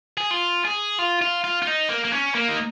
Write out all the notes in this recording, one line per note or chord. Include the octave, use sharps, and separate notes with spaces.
G#4
F4
G#4
F4
F4
F4
F4
D#4
A#3
A#3
C#4
A#3
D#4